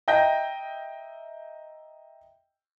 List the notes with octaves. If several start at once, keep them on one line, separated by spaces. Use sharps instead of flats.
D#5 E5 G5 A#5 G6 A#6